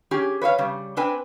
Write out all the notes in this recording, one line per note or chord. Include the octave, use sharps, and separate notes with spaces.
C#4 G4 G#4
B4 C#5 E5 F5
C#3 G3
C4 D4 B4 G5 G#5